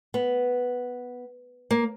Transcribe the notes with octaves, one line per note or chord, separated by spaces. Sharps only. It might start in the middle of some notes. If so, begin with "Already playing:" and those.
B3
A#3